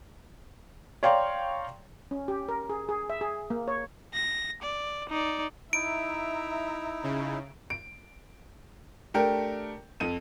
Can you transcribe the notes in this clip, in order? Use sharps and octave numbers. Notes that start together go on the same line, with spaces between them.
C#5 D5 F5 G5 A#5 C6
C#4
G4
A#4
G#4
G#4
E5
G#4
A#3
C#5
A#6
D5
D#4 D5
D#4 E4 E5 A#5 D7
C#3
D7
A3 D4 G4 A#4 G5
F2 D#7